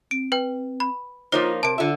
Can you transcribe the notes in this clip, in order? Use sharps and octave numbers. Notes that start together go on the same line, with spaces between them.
C4 D7
B4 G5
B5
F3 A#3 D#4 F4 C5 C#5
C3 A#4 A5 D7
D3 F4 E5